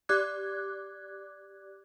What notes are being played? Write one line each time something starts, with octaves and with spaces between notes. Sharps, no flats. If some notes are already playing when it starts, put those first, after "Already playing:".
G4 D5 D6 F#6 G#6